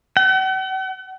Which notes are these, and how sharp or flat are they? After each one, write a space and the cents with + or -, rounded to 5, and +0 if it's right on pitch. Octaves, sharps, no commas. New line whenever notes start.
F#5 +45